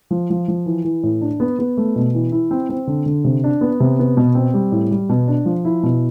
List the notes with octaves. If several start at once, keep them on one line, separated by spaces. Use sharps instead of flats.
F3
F3
F3
E3
E3
A2
D4
B3
B3
A3
B2
E3
E4
C4
C4
D3
D3
C3
D4
B3
C3
B3
B2
C4
G3
A2
G3
B2
D4
F3
E4
B2